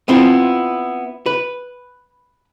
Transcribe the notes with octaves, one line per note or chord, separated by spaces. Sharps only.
B3 C4 E4 F4
B4